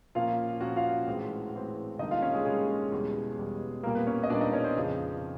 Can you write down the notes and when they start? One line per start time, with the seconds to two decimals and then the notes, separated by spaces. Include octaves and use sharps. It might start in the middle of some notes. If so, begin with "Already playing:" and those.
0.15 A#2 F3 A#3 C#4 F4 F5
0.60 A#2 F3 A#3 C#4 F#4 F#5
0.76 F4 F5
1.07 A2 E3 G#3 C4
1.54 A2 E3 G#3 C4
1.99 D3 G3 A#3 D#4 D#5
2.11 F4 F5
2.22 C#4 C#5
2.33 G#3 G#4
2.45 D3 G3 G#3 A#3 G#4
2.92 E2 B2 G3
3.38 E2 B2 G3
3.83 A#2 G3 A#3 A#4
3.95 B3 B4
4.07 C#4 C#5
4.24 D#5
4.30 A#2 G3 A#3 D4 D5
4.41 D#4 D#5
4.53 C#4 C#5
4.64 C4 C5
4.77 F2 C#3 F3